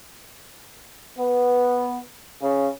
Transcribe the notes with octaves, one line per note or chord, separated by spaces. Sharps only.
B3
C#3